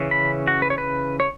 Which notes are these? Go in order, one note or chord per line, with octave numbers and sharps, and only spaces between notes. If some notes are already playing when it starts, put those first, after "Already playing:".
Already playing: C#3 E3 C#4
B5
F#4
B4
C#5
B4
C#5